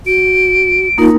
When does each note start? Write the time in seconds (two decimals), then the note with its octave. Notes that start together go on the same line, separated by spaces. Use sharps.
0.06 F#4 D7
0.98 A#3 D#4 F4 A#4